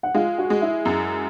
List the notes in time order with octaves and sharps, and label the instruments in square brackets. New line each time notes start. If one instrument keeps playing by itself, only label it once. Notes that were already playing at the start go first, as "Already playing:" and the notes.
[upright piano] F#5
[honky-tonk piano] G#3 [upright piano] F4 F5
[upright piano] F#4 F#5
[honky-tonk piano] G#3
[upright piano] E4 E5
[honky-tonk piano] F#2